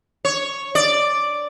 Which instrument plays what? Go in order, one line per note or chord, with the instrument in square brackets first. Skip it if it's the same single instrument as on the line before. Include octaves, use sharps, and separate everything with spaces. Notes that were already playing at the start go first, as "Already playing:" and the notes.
[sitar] C#5
D5